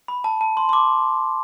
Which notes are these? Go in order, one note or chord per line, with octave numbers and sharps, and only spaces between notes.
B5
A5
A5
C6
C6
D6